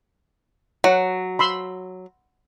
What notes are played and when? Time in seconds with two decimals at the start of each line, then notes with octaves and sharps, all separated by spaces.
0.84 F#3 F#5
1.39 B5 C6 E6